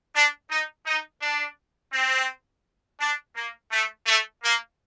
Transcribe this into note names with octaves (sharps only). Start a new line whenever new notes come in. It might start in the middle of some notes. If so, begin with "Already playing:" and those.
D4
D#4
D#4
D4
C4
D4
A#3
A3
A3
A#3